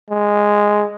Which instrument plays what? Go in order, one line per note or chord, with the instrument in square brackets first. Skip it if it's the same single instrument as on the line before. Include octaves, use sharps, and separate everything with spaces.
[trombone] G#3